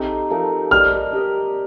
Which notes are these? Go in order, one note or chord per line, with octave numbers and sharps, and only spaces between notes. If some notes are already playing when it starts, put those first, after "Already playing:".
Already playing: A3 C4 D#4 G4
F3 A3 D#4 A#4
D4 G4 C5 D#5 F6
D4 G4 A#4 D#5